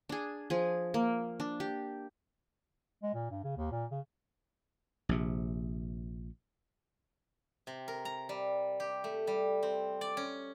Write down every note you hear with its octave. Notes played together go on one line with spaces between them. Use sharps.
D4 G#4
F3 G#4
A#3
D4
G4
G#3
A#2
G2
C#3
D#2
A#2
C#3
A#1 C3
C3
A#4
A#5
G3
G4
A3
G3
C4
D5
C#4